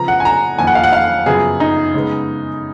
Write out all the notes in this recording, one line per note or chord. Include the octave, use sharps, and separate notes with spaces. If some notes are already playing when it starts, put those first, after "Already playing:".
Already playing: C#3 F3 B3 A#5
F#5
G#5
A#5
F2 D#3 A#3 G#5
F#5
F5
F#5
F5
F#2 C#3 F3 B3 G#4
D#4
C#3 G#3 B3